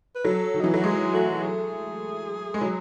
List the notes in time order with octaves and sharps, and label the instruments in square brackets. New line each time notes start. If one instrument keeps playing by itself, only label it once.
[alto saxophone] B4
[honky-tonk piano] F#3 [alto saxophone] A4
[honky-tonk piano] D#3
[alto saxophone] D#4
[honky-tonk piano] E3 [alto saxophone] E4
[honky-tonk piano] F#3 [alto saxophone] F#4
[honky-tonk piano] G#3 [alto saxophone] G#4
[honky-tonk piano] A3 [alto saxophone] F#4
[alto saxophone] G#4
[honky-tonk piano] G#3
F#3